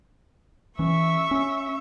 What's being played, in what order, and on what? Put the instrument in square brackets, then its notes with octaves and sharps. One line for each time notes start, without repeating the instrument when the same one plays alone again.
[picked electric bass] E3 C#4 [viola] E5 C#6
[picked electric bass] C#4